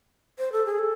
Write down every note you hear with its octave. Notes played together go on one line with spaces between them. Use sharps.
C5
A4
G#4
A4